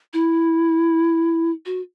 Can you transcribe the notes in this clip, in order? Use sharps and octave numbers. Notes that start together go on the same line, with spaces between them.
E4
F#4